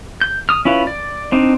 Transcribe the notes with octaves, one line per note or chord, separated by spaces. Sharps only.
G6
D#6 F6
C#4 E4 F4 B4
D5
C4 D4 D#4